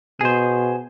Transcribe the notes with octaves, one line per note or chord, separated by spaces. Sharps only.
B2 G#4 C5